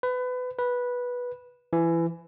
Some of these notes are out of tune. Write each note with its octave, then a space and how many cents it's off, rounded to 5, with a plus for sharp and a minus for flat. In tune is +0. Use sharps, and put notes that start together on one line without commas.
B4 +25
B4 -10
E3 +20